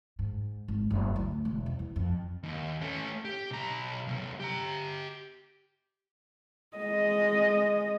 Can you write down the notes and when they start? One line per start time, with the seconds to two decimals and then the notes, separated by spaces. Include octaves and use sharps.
0.19 G#2
0.68 G#1
0.90 F#1
1.16 D2
1.45 E1
1.66 C2
1.79 E2
1.96 F2
2.43 D#2
2.81 A3 C#4
3.25 G4
3.51 B1 A#5
4.08 C3 F#3
4.40 G4 A#5
6.77 G#3 D#5